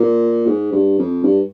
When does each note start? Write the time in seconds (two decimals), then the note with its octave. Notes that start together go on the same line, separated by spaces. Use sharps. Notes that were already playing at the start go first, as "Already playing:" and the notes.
Already playing: A#2
0.47 G#2
0.72 G2
0.99 F2
1.23 G2